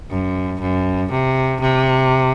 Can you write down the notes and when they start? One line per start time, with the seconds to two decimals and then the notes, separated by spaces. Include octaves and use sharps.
0.10 F#2
0.61 F#2
1.11 C3
1.61 C3